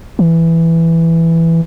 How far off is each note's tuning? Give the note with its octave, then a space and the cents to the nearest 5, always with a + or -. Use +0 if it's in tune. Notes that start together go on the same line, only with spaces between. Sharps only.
E3 +5